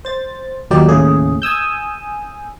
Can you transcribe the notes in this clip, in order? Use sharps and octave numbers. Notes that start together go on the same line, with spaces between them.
C5 A6
D#2 A#2 F#3 D#4 G4 D5
D#2 A2 C#3 G#4
G#5 D#6 E6 G6